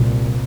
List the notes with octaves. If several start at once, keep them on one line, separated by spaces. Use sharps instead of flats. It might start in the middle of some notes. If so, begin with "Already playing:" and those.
Already playing: C2 A#2